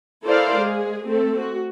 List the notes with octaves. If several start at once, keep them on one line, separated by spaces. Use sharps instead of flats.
E4 A4 A#4 C5 D5 F5
G#3 G#4
A3 C4 A4
F#4